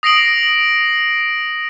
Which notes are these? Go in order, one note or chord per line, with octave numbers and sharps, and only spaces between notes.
D#6 A#6 C7 D7 F#7